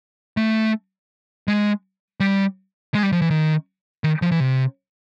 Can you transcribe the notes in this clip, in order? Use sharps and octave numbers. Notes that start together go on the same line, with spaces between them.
A3
G#3
G3
G#3
G3
F3
E3
D#3
D#3
F3
E3
C3